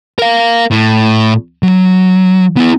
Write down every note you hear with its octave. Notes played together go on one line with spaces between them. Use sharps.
A#4 F5
A2
F#3
B3 E4